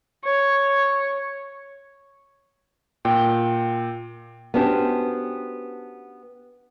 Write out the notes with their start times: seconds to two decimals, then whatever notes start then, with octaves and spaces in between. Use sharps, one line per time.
0.24 C#5
3.05 A#2 G5
4.54 B3 C#4 D4 F#4 G4 C5